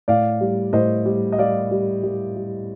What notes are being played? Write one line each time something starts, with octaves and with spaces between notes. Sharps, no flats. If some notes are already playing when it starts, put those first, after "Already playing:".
A2 D5 F5
G3
A2 C5 D#5
G3
D#5
G3 D5 F5
G3
G3
G3